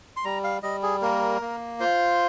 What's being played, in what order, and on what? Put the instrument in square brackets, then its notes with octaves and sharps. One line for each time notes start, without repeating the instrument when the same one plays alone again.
[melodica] C6
G3 A#5
F5
G3 D#5
G#4
A#3 A#4
A#3
F4 C5